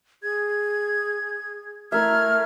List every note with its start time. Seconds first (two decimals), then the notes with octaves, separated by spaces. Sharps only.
0.23 G#4 G#6
1.92 A3 E4 A#4 E5 F6 G#6